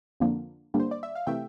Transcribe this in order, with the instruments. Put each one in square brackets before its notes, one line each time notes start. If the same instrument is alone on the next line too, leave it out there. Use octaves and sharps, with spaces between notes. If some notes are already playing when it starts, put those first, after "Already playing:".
[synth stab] F2 D3 F3 A#3
G2 D3 G3 A#3
C5
D5
E5
F5
C3 E3 A3 E5 G5